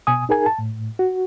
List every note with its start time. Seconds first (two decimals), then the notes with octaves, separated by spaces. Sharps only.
0.07 B2 G#5 D#6
0.29 D#4 G#4 A#4 G#5
0.46 A5
0.59 A2
0.99 F#4